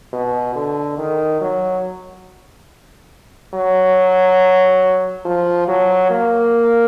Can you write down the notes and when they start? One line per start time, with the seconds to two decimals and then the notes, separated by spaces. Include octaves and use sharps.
0.13 B2
0.55 D3
0.98 D#3
1.41 F#3
3.54 F#3
5.25 F3
5.67 F#3
6.10 A#3